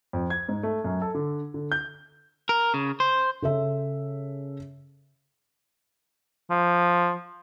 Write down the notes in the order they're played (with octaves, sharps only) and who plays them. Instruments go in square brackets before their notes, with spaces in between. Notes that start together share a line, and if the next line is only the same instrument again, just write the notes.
[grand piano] F2
G#6
G#2
A3
F#2
A4
D3
D3
G6
[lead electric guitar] A#4
C#3
C5
[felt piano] C#3 A4 E5
[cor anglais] F3